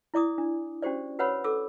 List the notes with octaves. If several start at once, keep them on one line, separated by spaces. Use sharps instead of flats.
E4 D5 D6 D#6
D4
C#4 F#4 G4 C5 D5
F#4 B4 C#5 F#5 B5 E6
A4 D6 E6